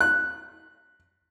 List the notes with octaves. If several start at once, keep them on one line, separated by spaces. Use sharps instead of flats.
F#6